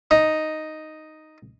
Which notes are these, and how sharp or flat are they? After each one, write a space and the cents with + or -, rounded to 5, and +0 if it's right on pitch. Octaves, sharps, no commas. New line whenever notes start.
D#4 +0